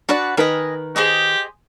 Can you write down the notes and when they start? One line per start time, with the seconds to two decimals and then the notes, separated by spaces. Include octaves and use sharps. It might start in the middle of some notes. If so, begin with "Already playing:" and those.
0.09 D4 F#4 B4 D5 F#5
0.37 D#3 A#4 B4 D#5 G#5
0.96 G4 G#4 C5 D#5